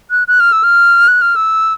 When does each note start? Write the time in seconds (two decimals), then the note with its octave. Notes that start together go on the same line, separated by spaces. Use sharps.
0.11 F#6
0.28 F#6
0.40 F6
0.52 E6
0.64 F6
1.08 F#6
1.21 F6
1.36 E6